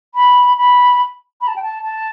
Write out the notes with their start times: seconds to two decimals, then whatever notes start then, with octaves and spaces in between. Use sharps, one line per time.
0.15 B5
0.57 B5
1.41 B5
1.48 A5
1.56 G5
1.62 A5
1.83 A5